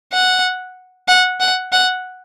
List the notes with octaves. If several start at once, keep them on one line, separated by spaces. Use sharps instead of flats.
F#5
F#5
F#5
F#5